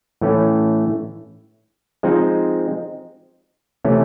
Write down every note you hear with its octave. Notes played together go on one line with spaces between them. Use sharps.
A2 E3 A3 C#4
F3 G#3 C4 D#4
C3 E3 A3 C#4